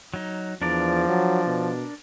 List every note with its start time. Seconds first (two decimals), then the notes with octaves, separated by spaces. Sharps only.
0.14 F#3 D#4
0.62 E2 F3 D4 A#4 D5
1.09 F#3
1.47 B2